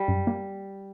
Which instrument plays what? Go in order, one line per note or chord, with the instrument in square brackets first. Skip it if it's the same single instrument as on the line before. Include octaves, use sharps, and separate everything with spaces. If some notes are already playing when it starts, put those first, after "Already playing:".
Already playing: [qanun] G3
[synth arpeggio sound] F#2
A#3